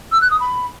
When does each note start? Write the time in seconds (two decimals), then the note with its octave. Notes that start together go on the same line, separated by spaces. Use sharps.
0.12 E6
0.21 F#6
0.31 D#6
0.40 B5